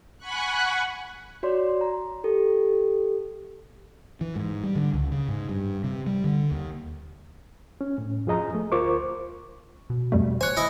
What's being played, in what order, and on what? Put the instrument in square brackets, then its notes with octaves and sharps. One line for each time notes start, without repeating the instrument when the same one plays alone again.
[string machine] F#5 G#5 B5 C#6 F#6
[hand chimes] F#4 C#5 D5 C6
A#5
G4 A4
[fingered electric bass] E3
G#2
G3
D3
C#2
C#3
G#2
G2
C3
G3
D3
D#2
[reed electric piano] C#4
A2
F2 F3 G#4 D#5 A#5
A3
D2 F4 A#4 C5 C#6 D6
[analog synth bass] B2
[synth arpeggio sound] F2 G3 A3
[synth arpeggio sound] C5 F#6 [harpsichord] C#5 G#5
[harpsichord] E4 D#5 G#5